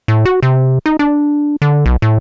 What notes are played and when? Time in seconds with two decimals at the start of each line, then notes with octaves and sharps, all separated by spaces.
0.08 A2
0.25 F#4
0.43 C3
0.86 D#4
0.99 D4
1.62 D3
1.86 B1
2.02 A2